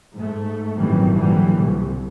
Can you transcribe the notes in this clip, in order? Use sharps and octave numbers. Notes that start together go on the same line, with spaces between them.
G#2 A3
G#1 F#2 A#2 D#3 E3 G3
A#2 D3 E3 F#3 G3
C2